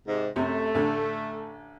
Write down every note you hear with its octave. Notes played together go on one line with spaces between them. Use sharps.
G#2 C3
F#2 C3 A3
A1 D3